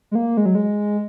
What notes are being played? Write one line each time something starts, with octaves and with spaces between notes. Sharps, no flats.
G#3
A#3
G#3
F#3
G#3